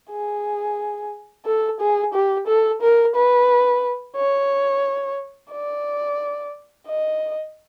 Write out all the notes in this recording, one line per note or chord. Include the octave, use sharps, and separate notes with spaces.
G#4
A4
G#4
G4
A4
A#4
B4
C#5
D5
D#5